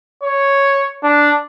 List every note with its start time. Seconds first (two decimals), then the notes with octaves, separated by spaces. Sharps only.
0.23 C#5
1.03 D4